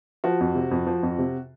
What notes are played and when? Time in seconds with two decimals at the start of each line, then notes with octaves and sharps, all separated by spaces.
0.24 F3 F#4
0.40 F2
0.55 C3
0.71 F2
0.87 F3
1.03 F2
1.18 C3